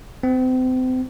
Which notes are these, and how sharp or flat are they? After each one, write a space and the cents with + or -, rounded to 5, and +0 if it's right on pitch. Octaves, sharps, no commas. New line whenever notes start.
C4 -35